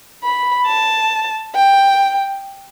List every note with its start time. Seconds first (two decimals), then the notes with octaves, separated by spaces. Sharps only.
0.24 B5
0.67 A5
1.55 G5